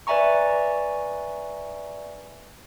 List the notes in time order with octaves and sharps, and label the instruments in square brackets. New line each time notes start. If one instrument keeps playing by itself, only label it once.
[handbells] B4 D5 E5 G#5 A#5 C#6